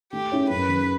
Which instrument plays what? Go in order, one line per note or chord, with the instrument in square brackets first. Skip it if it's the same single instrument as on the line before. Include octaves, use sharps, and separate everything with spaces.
[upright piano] A3 [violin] G4
[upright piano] C#4 E4 G#4 C#5
[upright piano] F#2 [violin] B4
[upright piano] C#3 F#3